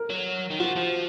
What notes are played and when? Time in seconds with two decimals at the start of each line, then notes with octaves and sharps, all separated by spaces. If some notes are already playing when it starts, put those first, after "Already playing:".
Already playing: A#4
0.10 F#3
0.51 D#3
0.60 F3 F#4
0.76 F3